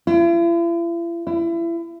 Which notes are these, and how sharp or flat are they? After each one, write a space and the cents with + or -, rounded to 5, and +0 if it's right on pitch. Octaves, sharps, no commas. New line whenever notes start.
E4 +45
E4 +30